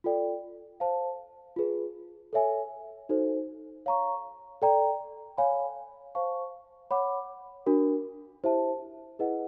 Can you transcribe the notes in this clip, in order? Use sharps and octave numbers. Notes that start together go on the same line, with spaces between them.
F4 A4 D5 G5
C5 F5 A5
F4 G#4 B4
A4 C#5 E5 G#5
D#4 F#4 A4 C5
C#5 F5 A#5 C#6
A4 D5 G5 A#5
C#5 F5 G#5 B5
C5 F5 A5 C#6
C#5 F#5 B5 D6
D4 F#4 A#4
E4 G4 C5 E5 A5
E4 G#4 B4 D#5 F#5